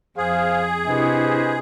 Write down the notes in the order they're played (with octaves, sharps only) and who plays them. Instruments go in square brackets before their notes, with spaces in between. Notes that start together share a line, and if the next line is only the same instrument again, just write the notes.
[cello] F2 [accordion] G#4 [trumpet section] C5 F5
[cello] C3 [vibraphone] D4 E4 C#6 [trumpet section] B4 C5 D#5